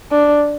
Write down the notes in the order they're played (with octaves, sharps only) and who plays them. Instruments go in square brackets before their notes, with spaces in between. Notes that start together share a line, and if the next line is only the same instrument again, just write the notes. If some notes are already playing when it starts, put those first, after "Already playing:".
[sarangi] D4